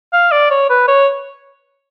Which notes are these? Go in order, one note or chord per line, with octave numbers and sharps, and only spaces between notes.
F5
D5
C#5
B4
C#5